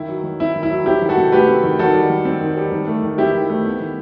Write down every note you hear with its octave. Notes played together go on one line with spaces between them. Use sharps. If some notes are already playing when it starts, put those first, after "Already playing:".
Already playing: D#3 E4
F#3
D#3
C4 E4
D#3
E4
F#3
C4 E4 G4
D#3
F#4 A4
C3
A3 G4 B4
C4
D#3
D#3 F#4 A4
G3
D#3
C4
D#3
G3
D#3
A3
D#3
C4 E4 G4
D#3
A3
B3
D#3